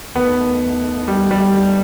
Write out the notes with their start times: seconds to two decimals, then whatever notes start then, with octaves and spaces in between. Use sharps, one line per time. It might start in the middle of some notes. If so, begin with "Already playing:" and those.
0.14 D#2 D#3 A3 B3
1.08 G3
1.31 G3